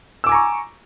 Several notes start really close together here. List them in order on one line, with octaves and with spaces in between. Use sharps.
E6 D6 G#5 A#5 C#6